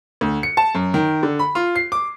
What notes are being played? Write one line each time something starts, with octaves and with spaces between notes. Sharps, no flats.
D2
C#7
A5
F#2
D#3
D3
B5
F4
C7
D6